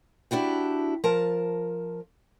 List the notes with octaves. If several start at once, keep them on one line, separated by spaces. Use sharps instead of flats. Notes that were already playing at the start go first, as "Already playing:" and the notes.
D4 E4 F#4 G4
F3 A#4 A5